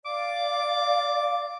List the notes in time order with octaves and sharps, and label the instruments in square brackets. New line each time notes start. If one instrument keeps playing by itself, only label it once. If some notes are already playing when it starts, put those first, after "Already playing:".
[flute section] D5 F5 [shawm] D6